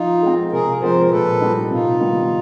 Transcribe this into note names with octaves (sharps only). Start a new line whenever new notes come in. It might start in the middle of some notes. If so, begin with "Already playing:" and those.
Already playing: F3 D#4 F4
G#3 C4
C3 G#4 A#4
F3 G#3 C4 A#4 C5
A#4
A#2 A4 B4
G3 C4 D#4
C3 D#4 F4
D#3 G3 B3